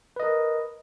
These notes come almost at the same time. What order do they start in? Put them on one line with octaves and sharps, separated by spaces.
B4 D#5 A#4